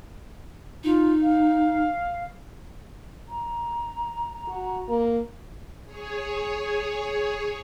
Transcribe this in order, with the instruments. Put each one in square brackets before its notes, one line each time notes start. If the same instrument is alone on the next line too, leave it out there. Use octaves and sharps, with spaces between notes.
[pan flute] D#4 [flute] F4
[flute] F5
[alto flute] A#5
[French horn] F#4
A#3
[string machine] G#4 C#5